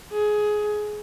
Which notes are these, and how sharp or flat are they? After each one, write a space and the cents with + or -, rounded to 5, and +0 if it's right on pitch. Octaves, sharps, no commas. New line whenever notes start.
G#4 +15